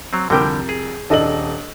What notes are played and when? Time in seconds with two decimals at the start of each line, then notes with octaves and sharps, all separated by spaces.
0.13 F#3 C4
0.30 C2 F2 D3 G3 A#4 G5 G6
0.69 G#4
1.10 D#1 D4 A4 D#5 F#7